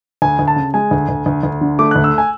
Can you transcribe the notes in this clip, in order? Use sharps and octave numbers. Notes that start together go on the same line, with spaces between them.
D2 G#5
D2
A5
C#3
G#3 G#5
D2
D2
D2
D2
D3
A3 D6
F#6
D2
E6
G#5